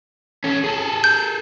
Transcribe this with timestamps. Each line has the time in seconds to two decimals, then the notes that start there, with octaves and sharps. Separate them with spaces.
0.44 C#4 A4
0.64 G#4 A4
1.04 G6